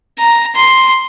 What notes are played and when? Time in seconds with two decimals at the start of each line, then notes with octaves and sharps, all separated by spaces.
0.18 A#5
0.55 C6